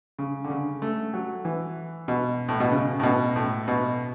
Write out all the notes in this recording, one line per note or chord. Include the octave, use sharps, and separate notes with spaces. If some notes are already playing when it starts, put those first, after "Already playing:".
C#3
D3
C#3
A3
F#3
E3
B2
A2
B2
C#3
A2
B2
A2
B2